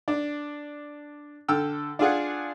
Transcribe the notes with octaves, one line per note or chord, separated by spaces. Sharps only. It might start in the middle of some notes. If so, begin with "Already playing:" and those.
D4
D3 A4 G5 E6 F6
D4 F4 G#4 F#5